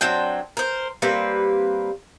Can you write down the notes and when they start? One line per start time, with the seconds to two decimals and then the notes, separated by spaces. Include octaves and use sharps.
0.01 F#3 C4 D4 G5
0.57 A#4 C5
1.02 G3 A#3 C4 B4